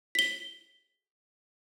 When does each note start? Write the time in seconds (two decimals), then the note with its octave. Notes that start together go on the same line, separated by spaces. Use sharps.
0.15 B6 G7